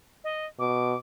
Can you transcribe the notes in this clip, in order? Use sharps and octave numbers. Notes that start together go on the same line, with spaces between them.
D#5
B2 D6